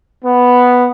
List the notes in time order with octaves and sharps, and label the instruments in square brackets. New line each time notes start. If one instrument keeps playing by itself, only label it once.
[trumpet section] B3